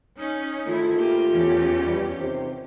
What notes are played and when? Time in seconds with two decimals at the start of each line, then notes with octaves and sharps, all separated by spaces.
0.19 C#4 D#4
0.67 D2 G#2 D#3 A3 E4 F4
0.99 A#3 G4
1.32 E2 C#4
1.84 G2 B2 G3
2.20 C3 D#3 C5